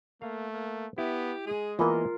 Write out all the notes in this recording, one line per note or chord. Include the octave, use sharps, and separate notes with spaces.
A3 A#3 F5
A#3
B3 E4 G4
G#3 G#4
E3 A#3 B3 F4 A#4 D#5